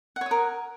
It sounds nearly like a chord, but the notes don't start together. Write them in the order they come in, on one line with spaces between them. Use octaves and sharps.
F#5 C#5 D#6 A#4